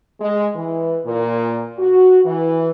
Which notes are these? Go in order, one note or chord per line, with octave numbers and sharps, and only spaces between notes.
G#3
E3
A#2
F#4
E3